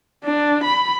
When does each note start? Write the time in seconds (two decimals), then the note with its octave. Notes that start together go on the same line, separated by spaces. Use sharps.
0.25 D4
0.64 B5